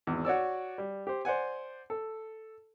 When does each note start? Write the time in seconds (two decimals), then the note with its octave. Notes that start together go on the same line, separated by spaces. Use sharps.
0.07 G#1 E2
0.25 F#4 C#5 D5 E6
0.78 G3
1.07 G4 C5
1.25 C5 D5 F#5 G#5
1.90 A4